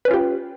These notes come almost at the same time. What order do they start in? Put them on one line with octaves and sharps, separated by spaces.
B4 C#4 F4 G4